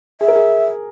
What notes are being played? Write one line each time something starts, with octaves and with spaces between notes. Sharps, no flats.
G#4 E5
A#4
G#4